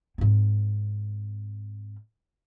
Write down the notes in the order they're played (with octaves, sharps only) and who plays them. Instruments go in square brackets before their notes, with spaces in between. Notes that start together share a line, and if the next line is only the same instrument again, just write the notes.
[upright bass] G#2 C4